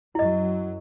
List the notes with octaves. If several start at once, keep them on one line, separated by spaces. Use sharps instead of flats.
F#2 F#3 E4 D#5